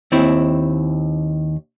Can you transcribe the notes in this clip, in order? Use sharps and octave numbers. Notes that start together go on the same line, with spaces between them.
D#2 C4 E4